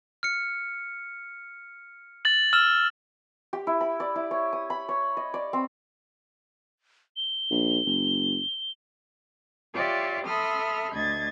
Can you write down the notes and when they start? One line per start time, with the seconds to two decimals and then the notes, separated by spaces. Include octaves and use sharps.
0.23 F6 C#7
2.25 A6 F#7
2.53 E6 F6 E7
3.53 G4
3.67 E4
3.81 B5
4.00 D5
4.16 E4
4.31 C#5
4.53 D#6
4.70 B5
4.89 C#5
5.17 D#5
5.34 D5
5.53 C4
7.17 G7
7.51 A#1
7.86 F#1
9.74 F4 G4 C#5 D5 E5
10.25 A4 E5 B5 C6 D#6 F6
10.92 D2 D#5 G#6 A6